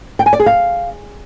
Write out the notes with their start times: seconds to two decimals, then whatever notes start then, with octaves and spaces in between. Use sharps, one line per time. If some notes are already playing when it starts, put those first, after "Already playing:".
0.19 G5
0.26 G#5
0.33 D5
0.40 G#4
0.46 F5